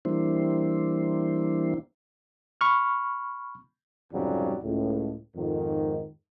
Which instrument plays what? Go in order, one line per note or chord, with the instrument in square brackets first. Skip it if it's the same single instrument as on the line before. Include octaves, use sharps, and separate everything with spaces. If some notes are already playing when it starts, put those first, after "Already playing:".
[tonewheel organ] E3 G3 A#3 D4 E4 C5
[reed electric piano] B5 C#6 F6
[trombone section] C2 F2 G#2 C#3 F#3 G3
C#2 A2
F2 G#2 D#3